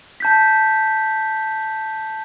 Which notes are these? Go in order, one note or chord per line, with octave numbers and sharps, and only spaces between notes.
A5 G6 B6